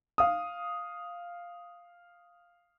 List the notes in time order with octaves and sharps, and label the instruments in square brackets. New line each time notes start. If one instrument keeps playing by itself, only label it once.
[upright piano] F5 D#6